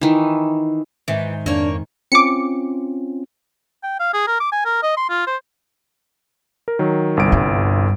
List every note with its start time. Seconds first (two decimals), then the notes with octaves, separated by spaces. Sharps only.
0.01 D#3 E3
1.08 G#2 D#3 E3
1.46 F2 A#3 D4 C#5
2.12 C4 C#4 F4 D6 C#7
3.83 G5
4.00 F5
4.14 G#4
4.27 A#4
4.40 D6
4.52 G#5
4.65 A#4
4.83 D#5
4.97 C6
5.10 F4
5.27 C5
6.68 A#4
6.79 D#3 F#3
7.17 G1 C2 D7
7.32 G2